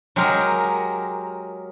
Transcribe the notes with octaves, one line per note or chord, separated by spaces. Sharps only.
F#3 G#3 G4 A#4